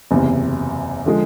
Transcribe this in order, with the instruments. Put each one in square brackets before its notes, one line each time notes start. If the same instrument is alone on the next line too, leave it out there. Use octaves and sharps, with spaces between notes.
[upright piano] F#1 E2 C3
D3 F3 G#3